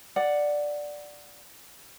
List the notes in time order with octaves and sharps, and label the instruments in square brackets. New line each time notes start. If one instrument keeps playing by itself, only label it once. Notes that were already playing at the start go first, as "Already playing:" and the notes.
[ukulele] D5 F#5